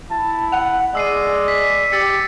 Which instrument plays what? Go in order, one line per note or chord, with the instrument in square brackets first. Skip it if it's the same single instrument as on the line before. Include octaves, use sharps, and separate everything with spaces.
[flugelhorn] E4 [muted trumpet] A5
[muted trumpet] F#5 [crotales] F7
[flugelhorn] G#3 [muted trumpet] D5 [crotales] E6 C7 D#7
[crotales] B6
[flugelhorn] G4 [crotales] E6 A6 C#7